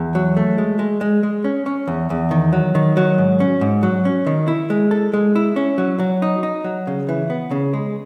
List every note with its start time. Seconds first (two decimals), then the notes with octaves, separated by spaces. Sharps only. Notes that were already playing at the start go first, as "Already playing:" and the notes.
Already playing: E2
0.15 F#3
0.37 A3
0.58 G#3
0.79 G#3
1.01 G#3
1.23 G#3
1.44 C#4
1.66 C#4
1.87 E2
2.10 E2
2.31 D#3
2.53 F#3
2.75 D#3
2.97 F#3
3.18 G#2
3.40 C#4
3.61 G#2
3.83 F#3
4.05 C#4
4.27 D#3
4.48 E4
4.70 G#3
4.91 A4
5.13 G#3
5.35 E4
5.56 C#4
5.78 F#3
6.00 F#3
6.22 D#4
6.43 D#4
6.64 F#3
6.87 C#3
7.09 E3
7.30 B3
7.51 C#3
7.73 G#3